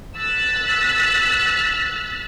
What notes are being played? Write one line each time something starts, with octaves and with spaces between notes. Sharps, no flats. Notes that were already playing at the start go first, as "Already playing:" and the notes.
E6 F#6 A6 B6